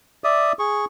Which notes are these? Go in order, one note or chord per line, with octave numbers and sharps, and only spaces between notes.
D5 E5 D#6
G#4 C#6